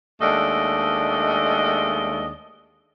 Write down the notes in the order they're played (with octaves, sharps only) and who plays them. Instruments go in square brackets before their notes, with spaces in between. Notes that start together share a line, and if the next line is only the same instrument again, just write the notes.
[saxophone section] D#2 G#3 A3 D4 D5 D#5